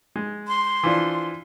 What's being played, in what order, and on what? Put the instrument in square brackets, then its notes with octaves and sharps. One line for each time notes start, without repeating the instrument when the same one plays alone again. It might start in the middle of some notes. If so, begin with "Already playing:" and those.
[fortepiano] G#3
[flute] C6
[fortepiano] E3 F3 D4